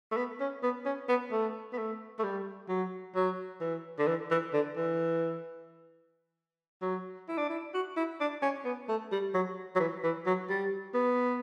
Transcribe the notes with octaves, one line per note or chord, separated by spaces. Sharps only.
A3
B3
C#4
B3
C#4
B3
A3
B3
A3
A3
G3
F#3
F#3
E3
D3
E3
E3
D3
E3
F#3
E4
D4
E4
F#4
E4
D4
C#4
B3
A3
G3
F#3
F#3
E3
E3
F#3
G3
B3